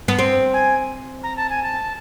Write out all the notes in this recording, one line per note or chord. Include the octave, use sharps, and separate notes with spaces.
B3
C4
G#5
A#5
A5
G#5
A5